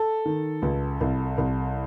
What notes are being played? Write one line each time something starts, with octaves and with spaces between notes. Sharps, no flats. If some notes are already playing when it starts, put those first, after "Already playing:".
Already playing: A4
D#3
C#2
C2
C2